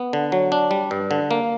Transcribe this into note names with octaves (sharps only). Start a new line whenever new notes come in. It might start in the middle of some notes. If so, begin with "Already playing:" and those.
Already playing: B3
D3
F#3
D4
G3
G2
D3
A#3